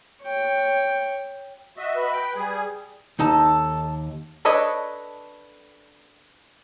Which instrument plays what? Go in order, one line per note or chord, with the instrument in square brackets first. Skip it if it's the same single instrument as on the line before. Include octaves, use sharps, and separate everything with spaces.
[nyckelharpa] C#5 G5
[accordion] F#4 D#5 E5
[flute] B4
[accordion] G5
G3 G#4
[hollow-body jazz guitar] D#2 D#4 A5 [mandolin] A4
[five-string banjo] D4 A4 B4 C#5 D#5